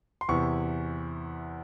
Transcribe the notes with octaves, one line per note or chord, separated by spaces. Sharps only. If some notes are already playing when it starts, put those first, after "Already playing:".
C6
E2 C3 E3 C#6